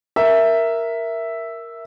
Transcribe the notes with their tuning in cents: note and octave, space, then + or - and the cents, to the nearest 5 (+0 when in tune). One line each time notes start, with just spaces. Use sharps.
A#4 +0 E5 +0